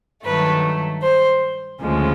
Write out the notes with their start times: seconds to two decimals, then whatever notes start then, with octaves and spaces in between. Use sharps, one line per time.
0.25 G2 D#3 F#3 A3 B4
1.02 C5
1.81 D2 C#3 F3 G#3